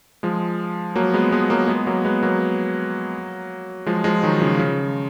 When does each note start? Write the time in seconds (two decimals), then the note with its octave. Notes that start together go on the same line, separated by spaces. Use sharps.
0.23 F3 G#3
0.95 F#3 A#3
1.14 G#3 B3
1.32 G#3 B3
1.50 F#3 A#3
1.68 G#3 B3
1.87 F#3 A#3
2.05 G#3 B3
2.23 F#3 A#3
3.86 F3 G#3
4.04 F3 G#3
4.23 D#3 F#3
4.40 C#3 F3
4.59 C#3